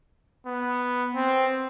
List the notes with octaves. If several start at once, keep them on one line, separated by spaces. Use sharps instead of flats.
B3
C4